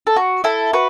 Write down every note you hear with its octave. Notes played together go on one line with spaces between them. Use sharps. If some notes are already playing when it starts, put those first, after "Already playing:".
A4
F#4
E4 A4
F#4 B4